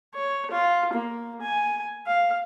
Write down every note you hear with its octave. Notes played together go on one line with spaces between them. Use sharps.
C#5
F4
A#3
G#5
F5